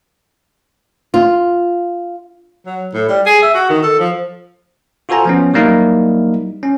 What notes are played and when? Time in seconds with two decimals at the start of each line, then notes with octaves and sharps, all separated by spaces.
1.14 F4
2.66 F#3
2.94 A2
3.09 G3
3.26 G#4
3.42 E5
3.55 F#4
3.70 D#3
3.83 A4
4.00 F3
5.09 F4 F#4 A4 C5 G#5 A#5
5.25 F3 B3 C#4
5.54 F#3 G3 A#3 D#4 E4 A#4
6.63 C#4